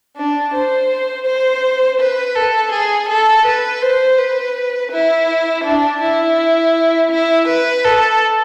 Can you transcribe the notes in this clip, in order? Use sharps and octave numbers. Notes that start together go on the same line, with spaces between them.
D4
C5
C5
B4
A4
G#4
A4
B4
C5
B4
E4
D4
E4
E4
B4
A4